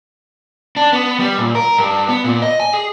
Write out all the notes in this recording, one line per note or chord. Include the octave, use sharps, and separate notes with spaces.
D4
B3
G3
A#2
A#4
G2
B3
A#2
D#5
G#5
G#4